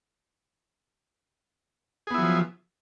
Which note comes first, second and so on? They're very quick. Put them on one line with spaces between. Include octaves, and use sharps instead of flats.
G#4 B3 E4 F#3 F3